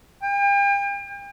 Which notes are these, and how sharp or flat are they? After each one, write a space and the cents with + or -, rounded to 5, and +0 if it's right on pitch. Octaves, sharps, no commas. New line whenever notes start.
G5 +40